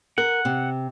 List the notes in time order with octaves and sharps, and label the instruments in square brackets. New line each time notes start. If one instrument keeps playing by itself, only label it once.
[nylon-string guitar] A#4 [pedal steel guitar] F#5
[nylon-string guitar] C3